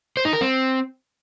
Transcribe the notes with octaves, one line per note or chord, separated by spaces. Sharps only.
C5
D#4
A#4
C4